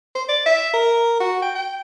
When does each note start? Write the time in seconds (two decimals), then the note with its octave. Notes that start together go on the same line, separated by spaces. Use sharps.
0.15 C5
0.29 D5
0.46 E5
0.73 A#4
1.20 F#4
1.42 G5
1.55 G5